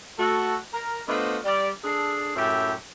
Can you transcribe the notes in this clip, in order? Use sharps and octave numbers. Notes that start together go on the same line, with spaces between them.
A3 F#4 A4
A#4
A3 B3 D4 F4 C5 D#5
G3 D5
D4 G#4 A4
F#2 A2 C#4 G4 E5